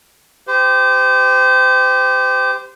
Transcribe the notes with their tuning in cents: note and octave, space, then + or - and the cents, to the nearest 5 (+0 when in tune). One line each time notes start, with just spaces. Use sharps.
G4 +5 C5 -30